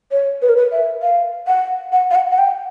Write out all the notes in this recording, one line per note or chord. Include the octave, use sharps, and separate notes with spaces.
C#5
B4
A#4
B4
E5
F5
F#5
F#5
F5
F#5
F#5
G5